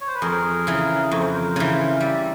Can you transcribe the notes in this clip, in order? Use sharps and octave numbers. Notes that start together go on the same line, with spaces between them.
C#5
C5
B4
F2 G#4 A#4
C#3 E3
F2 C#5
C5
B4
A#4 C5
C#3 E3
G3 D5 E5